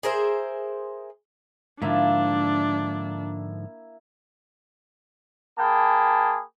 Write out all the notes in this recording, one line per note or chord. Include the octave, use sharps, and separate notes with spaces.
G#4 A#4 C5 E5
G#2 D3 F3 A#3 D4 E4 E5
A#3 G#4 G5 A5 B5